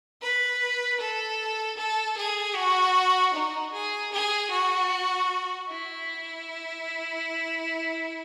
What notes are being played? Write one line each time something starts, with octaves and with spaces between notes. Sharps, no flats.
B4
A4
A4
G#4
F#4
D#4
G#4
G#4
F#4
E4